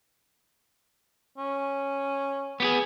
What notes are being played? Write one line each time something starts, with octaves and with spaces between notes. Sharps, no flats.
C#4
B3 G4 G#4